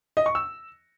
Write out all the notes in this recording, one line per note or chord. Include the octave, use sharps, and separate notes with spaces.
D#5
C#6
E6